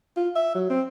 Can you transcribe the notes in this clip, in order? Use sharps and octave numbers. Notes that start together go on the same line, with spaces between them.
F4
E5
F#3
C4